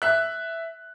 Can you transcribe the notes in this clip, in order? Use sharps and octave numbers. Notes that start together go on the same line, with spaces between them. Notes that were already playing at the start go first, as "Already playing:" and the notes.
E5 F#6